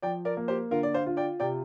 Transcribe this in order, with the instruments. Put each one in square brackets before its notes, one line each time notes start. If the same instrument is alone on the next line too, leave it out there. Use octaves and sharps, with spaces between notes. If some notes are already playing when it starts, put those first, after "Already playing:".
[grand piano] F3 [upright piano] D5 G5
[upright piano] A#4 D5
[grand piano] A#3
[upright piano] G4 C5
[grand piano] D3 [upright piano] F4 A#4
[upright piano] D5
C5 F5
[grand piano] F4
[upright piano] D5 G5
[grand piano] C3 [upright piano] D5 G5